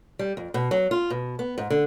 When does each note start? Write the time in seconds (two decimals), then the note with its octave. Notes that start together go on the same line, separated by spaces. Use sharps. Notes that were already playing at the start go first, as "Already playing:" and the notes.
0.19 G3
0.37 F2
0.54 B2
0.71 F#3
0.91 F4
1.10 B2
1.39 B3
1.58 G#2
1.70 D3